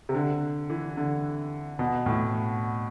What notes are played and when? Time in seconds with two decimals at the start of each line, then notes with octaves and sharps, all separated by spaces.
0.09 C3
0.15 D3
0.70 E3
0.97 D3
1.79 B2
2.06 A2